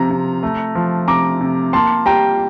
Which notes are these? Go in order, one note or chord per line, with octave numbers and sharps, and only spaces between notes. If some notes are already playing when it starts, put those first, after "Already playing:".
Already playing: C3 F3 A#5
C3
A3
F3
C3 A#5 D6
C3
A#3 A5 C6
G3 G5 A#5